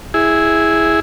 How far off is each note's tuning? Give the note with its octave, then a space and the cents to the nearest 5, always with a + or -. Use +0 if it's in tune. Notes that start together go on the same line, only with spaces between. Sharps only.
E4 -10 G#4 +0